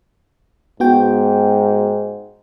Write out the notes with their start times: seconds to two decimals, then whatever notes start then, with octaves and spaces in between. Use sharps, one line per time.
0.80 G#2 B3 F#4 G5